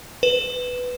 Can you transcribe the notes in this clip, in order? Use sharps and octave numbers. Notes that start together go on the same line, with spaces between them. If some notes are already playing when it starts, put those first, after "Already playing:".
B4